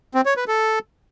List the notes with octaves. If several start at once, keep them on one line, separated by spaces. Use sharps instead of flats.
C4
C#5
B4
A4